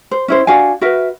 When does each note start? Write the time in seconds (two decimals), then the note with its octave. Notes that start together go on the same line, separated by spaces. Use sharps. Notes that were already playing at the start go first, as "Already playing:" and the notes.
0.11 C5
0.28 C#4 E4 C5
0.47 D4 F#4 F5 G#5
0.81 F#4 A#4 B4 E5